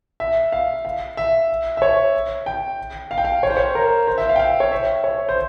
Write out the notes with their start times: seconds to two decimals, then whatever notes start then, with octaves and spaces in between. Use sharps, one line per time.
0.20 E5
0.52 F5
0.85 F5
1.17 E5
1.77 E5
1.82 C#5
2.46 G5
3.11 F5
3.18 G5
3.25 F5
3.43 C#5
3.50 C5
3.57 C#5
3.75 A#4
4.07 C5
4.18 E5
4.29 F5
4.36 G5
4.39 F5
4.60 C#5
4.72 E5
5.04 C#5
5.29 C5